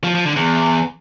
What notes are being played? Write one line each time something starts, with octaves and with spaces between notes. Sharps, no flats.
F3
F3
D3
E2